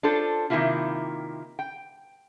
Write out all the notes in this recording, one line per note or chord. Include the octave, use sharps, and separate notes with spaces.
D4 F4 A4 C5 C#5
C3 D#3 G#3 A#3 E4 F4
G5